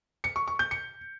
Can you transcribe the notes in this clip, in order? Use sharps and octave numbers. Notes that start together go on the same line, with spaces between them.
C#7
C#6
C#6
G6
C#7